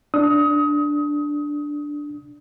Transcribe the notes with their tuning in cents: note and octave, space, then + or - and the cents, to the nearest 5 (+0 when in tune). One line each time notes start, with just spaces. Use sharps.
D4 +0 D#6 +25